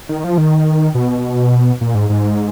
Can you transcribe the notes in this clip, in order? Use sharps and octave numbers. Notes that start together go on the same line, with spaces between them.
D#3
F3
D#3
B2
A#2
G#2
G#2